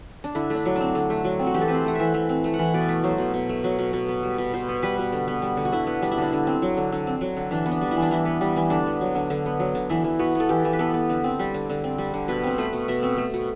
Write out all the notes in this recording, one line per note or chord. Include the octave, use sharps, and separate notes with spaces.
D4
D3 E4
A3
D4
F#3
C4 D4
D3
A3
F#3
C4
F#4
E3 G4
A4
C4 B4
C5
A3 F#5
E3 E5
E3
C4
A3
F#5
E3
B2 D5
A3
F#3 C5
B2
B2
A3
F#3
B2
B2
B3
G3
B2
B2 C5
B3
G3 B4
B2
D3
B3
G3
D3
F#4
D3 E4
B3
G3 D4
E4
D3 D4
D3
C4
F#3
D3
D3
C4
F#3
D3
E3 D4
B3
D4
G3
E4
E3
D4
E3 E4
B3
G3
E3
D3 D4
B3
F#3
D3
D3
B3
F#3
D3
E3 E4
E3
B3 F#4
B3
A4
E3 G4
E3
B4
B3 A4
B3
D3
C4
G3
D3
D3
C4
G3
D3
B2 B4
C4 C5
A3 B4
B2
B2 E5
C4
A3
B2